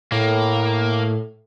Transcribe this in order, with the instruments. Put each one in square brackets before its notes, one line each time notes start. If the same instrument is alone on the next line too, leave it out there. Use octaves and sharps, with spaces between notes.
[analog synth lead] A2 [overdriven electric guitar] A#3